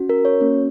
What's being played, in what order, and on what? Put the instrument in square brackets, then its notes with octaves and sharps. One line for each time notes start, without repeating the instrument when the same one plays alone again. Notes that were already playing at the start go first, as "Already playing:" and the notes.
Already playing: [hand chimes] C#4 F#4
A#4
C#5
A#3 C#4 F#4